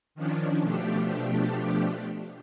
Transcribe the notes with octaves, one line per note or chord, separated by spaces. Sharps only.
D#3 F3 C#4 D4
B2 F3 A3 D4 G4